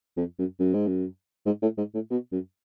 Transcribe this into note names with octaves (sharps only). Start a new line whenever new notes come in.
F2
F#2
F#2
G#2
F#2
G#2
A2
G#2
A2
B2
F#2